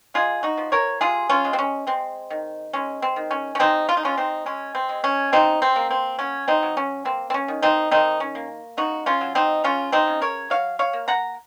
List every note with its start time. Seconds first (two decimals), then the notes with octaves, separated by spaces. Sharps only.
0.14 G#3 F4 G#4
0.43 D#4 F#4
0.57 F3
0.72 A#4 C#5
1.01 C3 F4 G#4
1.29 C#4 F4
1.45 G#3
1.53 C4
1.59 C#4
1.87 G#3 C4
2.30 D#3
2.73 G#3 C#4
3.02 C4
3.16 D#3
3.31 C#4
3.55 C#4
3.59 G#3 C4 D#4
3.89 F4
3.97 D#4
4.03 G#3 C#4 F4
4.17 C4 D#4
4.46 G#3 C#4
4.75 C4
4.89 G#3
5.04 C#4
5.32 C#3 C4 D#4
5.62 C4
5.76 A#3
5.91 C4
6.19 F#3 C#4
6.48 C4 D#4
6.63 F#3
6.77 C#4
7.05 A#3 C4
7.30 C4
7.34 C#4
7.48 D#3
7.62 C4 D#4
7.91 D#3 C4 D#4
8.20 C#4
8.35 A#3
8.77 C#3 D#4 F#4
9.06 C#4 F4
9.21 F#3
9.35 C4 D#4
9.64 C#3 C#4 F4
9.92 C4 D#4
10.07 C#3
10.21 A#4 C#5
10.50 F#3 C#5 F5
10.79 C#5 F5
10.93 A#3
11.08 F#5 A#5